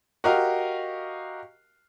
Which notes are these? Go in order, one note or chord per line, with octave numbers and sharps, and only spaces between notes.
F#4 G4 A#4 D#5 F5